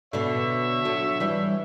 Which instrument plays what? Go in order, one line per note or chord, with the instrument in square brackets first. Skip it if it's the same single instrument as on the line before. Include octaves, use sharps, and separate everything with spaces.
[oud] B2 D3 [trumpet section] C#5 E5
[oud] D3 F#3
E3 G3